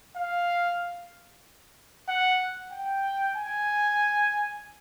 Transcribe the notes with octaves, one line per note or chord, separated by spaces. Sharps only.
F5
F#5
G5
G#5